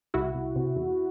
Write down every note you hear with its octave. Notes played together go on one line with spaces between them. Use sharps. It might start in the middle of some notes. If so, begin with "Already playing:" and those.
C2 E4 F#4
C2
C3
E2